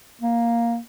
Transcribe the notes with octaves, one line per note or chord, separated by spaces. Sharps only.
A#3